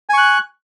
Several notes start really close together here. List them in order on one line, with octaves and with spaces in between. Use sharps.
G#5 C#6 F#6